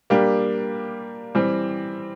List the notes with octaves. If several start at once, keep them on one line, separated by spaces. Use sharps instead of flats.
G3 A#3 D4 G4
E3 G3 C4